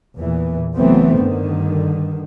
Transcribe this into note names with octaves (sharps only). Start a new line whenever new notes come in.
E2 A#2 E3
F#1 E3 F#3 A3 B3 C4
G2 D3 D#3